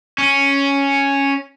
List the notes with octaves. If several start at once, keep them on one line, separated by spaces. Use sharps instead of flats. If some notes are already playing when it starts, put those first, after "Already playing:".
C#4